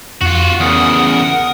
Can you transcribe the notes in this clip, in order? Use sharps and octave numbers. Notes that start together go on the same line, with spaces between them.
F2 F4 F#4
E2 C#3 A#4 F#5 D#6